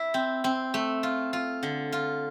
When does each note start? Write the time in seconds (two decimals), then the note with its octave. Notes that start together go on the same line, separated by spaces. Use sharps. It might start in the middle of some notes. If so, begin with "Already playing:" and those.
Already playing: E4
0.14 C4
0.44 C4
0.74 A3
1.03 F4
1.33 F4
1.63 D3
1.92 F4